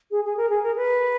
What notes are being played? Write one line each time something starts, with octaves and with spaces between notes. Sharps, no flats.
G#4
G#4
A#4
G#4
A#4
B4